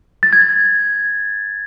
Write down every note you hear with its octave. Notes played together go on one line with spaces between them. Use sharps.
A6
G#6
A6